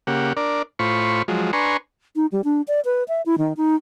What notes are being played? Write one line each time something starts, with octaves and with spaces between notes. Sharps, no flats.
C#3 A#3 G4 F#5
D4 A#4 D5
A2 F4 C5 B5 C#6
F3 F#3 G#3
D4 B4 G#5 A#5 C6 C#6
D#4
G3
D4
D5
B4
E5
E4
D#3
D#4